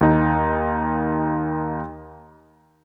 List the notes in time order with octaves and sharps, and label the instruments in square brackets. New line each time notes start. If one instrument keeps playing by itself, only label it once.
[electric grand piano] D#2 D#4